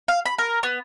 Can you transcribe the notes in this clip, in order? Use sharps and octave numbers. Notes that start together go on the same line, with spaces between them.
F5
B5
A#4
B3